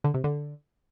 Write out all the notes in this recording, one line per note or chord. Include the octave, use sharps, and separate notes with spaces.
D3
C3
D3